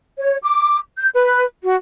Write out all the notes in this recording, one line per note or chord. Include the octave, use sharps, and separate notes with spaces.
C#5
D6
G6
B4
F#4